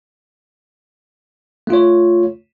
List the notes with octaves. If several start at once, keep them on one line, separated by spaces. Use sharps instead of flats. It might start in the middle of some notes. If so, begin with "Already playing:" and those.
A3 F4 C#5